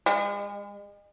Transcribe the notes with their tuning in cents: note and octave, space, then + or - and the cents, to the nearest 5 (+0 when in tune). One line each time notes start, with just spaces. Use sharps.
G#3 -40